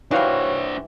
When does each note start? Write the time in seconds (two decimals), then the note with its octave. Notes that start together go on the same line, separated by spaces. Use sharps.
0.11 E3 G3 D4 D#4 F#4 C5 C#5 F5